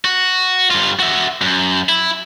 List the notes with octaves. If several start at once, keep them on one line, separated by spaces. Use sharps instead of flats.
F#4
G2 F4
F#4 E5
F#2
E4